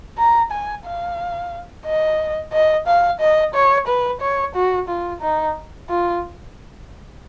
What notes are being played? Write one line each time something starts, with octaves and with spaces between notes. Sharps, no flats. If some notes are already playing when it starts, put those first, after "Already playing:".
A#5
G#5
F5
D#5
D#5
F5
D#5
C#5
B4
C#5
F#4
F4
D#4
F4